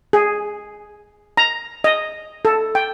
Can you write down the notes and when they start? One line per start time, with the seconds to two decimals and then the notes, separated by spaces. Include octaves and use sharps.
0.13 G#4
1.37 A#5
1.84 D#5
2.45 A4
2.75 G5